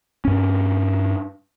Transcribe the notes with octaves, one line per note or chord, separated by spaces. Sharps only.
G2 C#4